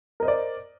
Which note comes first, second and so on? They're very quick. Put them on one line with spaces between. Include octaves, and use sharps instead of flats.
A#4 D#5 C5 D5